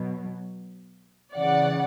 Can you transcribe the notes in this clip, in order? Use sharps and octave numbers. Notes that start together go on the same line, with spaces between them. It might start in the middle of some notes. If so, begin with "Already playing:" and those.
Already playing: B2 F#3
C#3 E3 D5 F#5